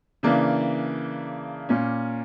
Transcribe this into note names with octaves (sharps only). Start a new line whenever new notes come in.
C#3 E3 A#3 D4
A#2 A#3 C#4